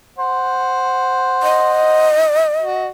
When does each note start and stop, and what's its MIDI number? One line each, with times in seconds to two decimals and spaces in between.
0.18 2.08 72
0.18 2.08 78
1.43 2.87 75
2.62 2.86 66